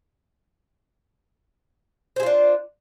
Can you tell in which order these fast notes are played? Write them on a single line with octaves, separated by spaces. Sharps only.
C5 G#4 F4 D4